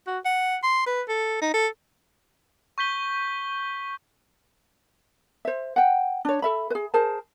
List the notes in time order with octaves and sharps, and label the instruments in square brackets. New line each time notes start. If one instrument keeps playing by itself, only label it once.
[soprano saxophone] F#4
F#5
C6
B4
A4
D#4
A4
[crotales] C#6 G6 B6 G7
[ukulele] C5 E5
F#5 G5
D4 C#5
A4 E5 B5
G#4 B4
G#4 A#4 C5 A5